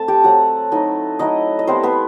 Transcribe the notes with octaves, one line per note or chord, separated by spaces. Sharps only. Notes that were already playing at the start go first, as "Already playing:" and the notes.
Already playing: A3 C4 A4 A5
G4 G5
F#3 A3 C4 F#4 F#5
F#3 A3 D#4 E4 D#5
F#3 A3 D#4 E4 D#5
D#5
G3 B3 C4 E4 C5
B3 B4